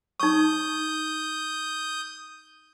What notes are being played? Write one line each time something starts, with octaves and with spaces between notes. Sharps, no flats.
D#4 C#6 D#6 G6